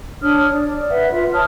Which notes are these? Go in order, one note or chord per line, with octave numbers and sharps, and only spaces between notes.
D4 C#5 D#6 F6
D5
B4 E5 F#5
F4 E5
C#5 A5 D#6 F6